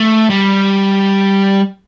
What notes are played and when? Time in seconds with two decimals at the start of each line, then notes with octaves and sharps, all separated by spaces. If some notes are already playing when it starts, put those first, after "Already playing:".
Already playing: A3
0.30 G3